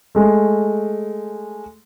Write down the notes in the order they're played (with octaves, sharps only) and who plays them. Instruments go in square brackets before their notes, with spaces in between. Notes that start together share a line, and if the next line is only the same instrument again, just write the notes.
[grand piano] G#3 A3